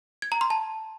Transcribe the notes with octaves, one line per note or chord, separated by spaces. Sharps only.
G#6
A#5
C6
A5